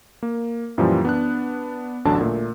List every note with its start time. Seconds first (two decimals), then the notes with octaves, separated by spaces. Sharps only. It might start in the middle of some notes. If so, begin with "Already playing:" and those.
0.23 A#3
0.78 F#2 A#2 E3 F3 G3
1.05 B3 D4 F#6
2.05 A1 D2 D3 F#3 D4 A5
2.21 A#2 A3